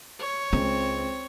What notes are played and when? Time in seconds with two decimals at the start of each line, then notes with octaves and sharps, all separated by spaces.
0.20 C#5
0.53 C#2 C4 C#4